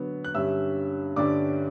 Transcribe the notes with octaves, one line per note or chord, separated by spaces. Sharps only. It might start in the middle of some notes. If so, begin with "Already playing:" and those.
Already playing: D3 F#3 B3
F#6
G2 D3 G3 C#4 E5 E6
G2 D3 G3 C#4 D5 D6